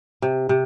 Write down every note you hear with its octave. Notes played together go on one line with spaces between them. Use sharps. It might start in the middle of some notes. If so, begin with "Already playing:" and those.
C3
C3